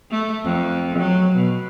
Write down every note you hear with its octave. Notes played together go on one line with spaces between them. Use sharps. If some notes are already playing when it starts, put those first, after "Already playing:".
A3
F2
F#3
B2